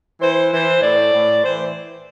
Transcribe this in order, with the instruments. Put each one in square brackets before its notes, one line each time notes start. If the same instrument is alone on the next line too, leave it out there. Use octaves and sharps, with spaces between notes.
[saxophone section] E3 C5
E3 C5
A2 D5
A2
E3 C5